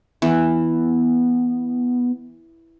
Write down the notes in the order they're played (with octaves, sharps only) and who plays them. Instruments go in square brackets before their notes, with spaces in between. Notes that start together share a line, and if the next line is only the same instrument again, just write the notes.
[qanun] E3 [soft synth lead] B3